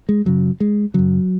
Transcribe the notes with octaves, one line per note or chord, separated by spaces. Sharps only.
G#3
F#2 C#3 F#3
G#3
F#2 C#3 F#3